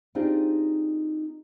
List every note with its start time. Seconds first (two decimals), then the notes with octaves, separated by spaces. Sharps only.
0.15 C4 D4 D#4 F4 G4 G#4